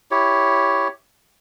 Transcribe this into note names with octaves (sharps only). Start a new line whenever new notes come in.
E4 G4 C#5